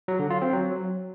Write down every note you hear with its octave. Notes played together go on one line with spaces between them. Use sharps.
F#3
D3
F4
C4
F#3